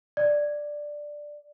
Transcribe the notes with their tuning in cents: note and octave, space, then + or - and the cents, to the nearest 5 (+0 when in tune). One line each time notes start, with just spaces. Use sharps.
D5 +5